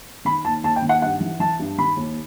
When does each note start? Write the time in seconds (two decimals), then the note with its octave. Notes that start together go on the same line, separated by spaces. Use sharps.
0.25 D#3 B5
0.45 D#2 A5
0.64 D#2 A5
0.76 G5
0.82 D#3
0.89 F#5
1.02 G2 F#5
1.20 E3
1.40 E3 A5
1.59 G2
1.78 D#3 B5
1.97 D#2